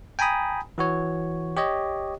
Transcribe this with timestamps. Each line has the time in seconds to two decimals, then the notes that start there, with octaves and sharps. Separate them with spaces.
0.19 G5 G#5 A#5 B5 D#6
0.78 E3 F#4 C#5
1.57 G4 C#5 D#5